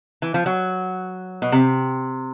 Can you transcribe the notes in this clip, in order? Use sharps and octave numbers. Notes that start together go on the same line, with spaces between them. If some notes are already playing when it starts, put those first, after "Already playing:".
E3
F3
F#3
B2
C3